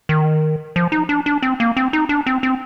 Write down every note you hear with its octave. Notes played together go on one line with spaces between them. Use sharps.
D#3
F3
D#4
D4
D4
C4
A#3
C4
D#4
D4
C4
C4